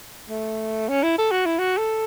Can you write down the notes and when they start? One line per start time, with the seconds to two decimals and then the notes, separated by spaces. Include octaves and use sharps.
0.29 A3
0.89 C#4
1.03 E4
1.18 A4
1.31 F#4
1.46 E4
1.59 F#4
1.78 A4